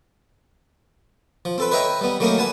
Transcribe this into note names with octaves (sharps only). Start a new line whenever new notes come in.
F3
C4 A4 B4
B4 C#5 D#5 E5 G5 A#5
G3 B3
F#3 A3 A#3 C#4 D#4 A#4
B4 F#5 G#5 A5